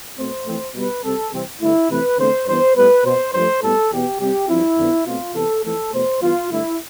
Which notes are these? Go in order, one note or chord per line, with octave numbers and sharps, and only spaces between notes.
B2 A3 C4 C5
F2 E3 A3 C4
B2 G3 B3 B4
C3 G3 C4 A4
C3 E3 G3 C4
G2 D3 A3 E4
C3 E3 A3 C4 B4
E2 D3 A3 C4 C5
G2 E3 B3 C5
A2 G3 B3 B4
B2 B3 C5
G2 F3 A3 C5
A2 G3 B3 A4
E2 B2 B3 G4
C3 G3 C4 G4
G2 F3 C4 E4
F2 D3 F3 B3
B2 A3 C4 F4
C3 E3 B3 A4
F2 E3 A3 A4
E2 B2 A3 C5
G2 E3 B3 F4
G2 D3 A3 E4